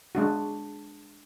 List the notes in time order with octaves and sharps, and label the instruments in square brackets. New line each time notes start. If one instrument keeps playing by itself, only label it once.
[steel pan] G#3 D4 F#4